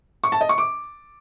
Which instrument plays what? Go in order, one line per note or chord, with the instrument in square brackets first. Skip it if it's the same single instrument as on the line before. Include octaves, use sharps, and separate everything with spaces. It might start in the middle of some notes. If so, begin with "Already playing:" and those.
[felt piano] C#6
A5
D#5
C#6
D6